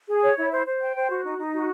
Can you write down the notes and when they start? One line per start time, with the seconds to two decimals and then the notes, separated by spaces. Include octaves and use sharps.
0.08 G#4
0.23 C#5
0.37 E4
0.52 C5
0.66 C5
0.81 G5
0.96 C5
1.10 F#4
1.24 D#4
1.38 D#4
1.53 F#4